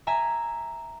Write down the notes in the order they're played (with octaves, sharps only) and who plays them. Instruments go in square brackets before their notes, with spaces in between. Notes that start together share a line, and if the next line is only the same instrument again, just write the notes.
[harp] E5 G#5 A#5